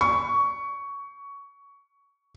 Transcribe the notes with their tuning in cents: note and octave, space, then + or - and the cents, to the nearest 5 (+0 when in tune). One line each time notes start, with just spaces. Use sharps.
C#6 +15